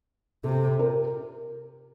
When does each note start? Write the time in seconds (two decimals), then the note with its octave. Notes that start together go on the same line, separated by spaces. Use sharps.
0.44 C3 A4
0.79 A#4